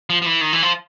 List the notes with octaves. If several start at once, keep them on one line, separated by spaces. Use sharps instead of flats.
F3
F3
E3
D#3
E3
F3